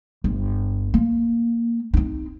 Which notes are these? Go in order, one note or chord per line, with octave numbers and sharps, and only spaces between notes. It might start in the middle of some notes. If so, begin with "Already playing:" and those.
G1
A#3
C4 D#4